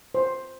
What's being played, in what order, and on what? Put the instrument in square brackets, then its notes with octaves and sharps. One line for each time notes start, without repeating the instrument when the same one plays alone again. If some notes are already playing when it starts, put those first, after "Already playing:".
[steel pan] C5